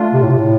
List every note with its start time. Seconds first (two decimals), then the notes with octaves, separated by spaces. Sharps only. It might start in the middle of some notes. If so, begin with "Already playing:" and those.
Already playing: A3 D4 F4
0.14 C3
0.22 A2
0.30 C3
0.39 A2